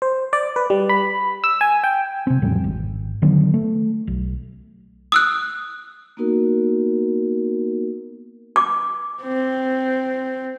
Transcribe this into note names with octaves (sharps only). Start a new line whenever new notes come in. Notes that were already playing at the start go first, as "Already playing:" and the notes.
C5
D5
B4
G3
B5
E6
G#5
G5
C3 C4
E2 A2 F3 G3
G#1
D3 D#3 F#3 B3
A3
B1
D#6 E6 F#6
A#3 B3 D#4 F#4 A#4
D6
C4